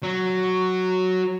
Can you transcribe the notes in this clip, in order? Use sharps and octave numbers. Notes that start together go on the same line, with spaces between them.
F#3